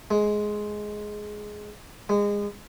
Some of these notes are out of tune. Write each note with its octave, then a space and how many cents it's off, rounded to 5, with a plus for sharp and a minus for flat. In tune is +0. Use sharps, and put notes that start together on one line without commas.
G#3 +10
G#3 -25